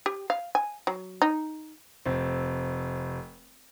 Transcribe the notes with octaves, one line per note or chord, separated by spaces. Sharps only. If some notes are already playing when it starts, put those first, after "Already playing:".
G4
F5
G#5
F#3
D#4
F1 C4